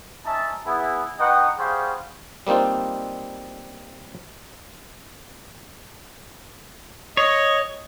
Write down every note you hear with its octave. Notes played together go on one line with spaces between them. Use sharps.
C#4 D#4 E5 A5
B3 E4 G#4
D#4 B4 D#5 F#5 G5 C#6
G3 G#4 C5 F5 F#5 C#6
G3 A#3 C4 D#4 F4
C#5 D#5